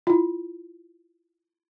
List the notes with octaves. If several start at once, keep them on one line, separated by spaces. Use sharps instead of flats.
E4 F4